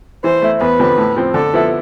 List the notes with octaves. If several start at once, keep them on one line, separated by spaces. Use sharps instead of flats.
E3 C5
A3 E4
E2 B4
D3 F3 C4
A2
F3 C4
D3 A4
F3 B3 E4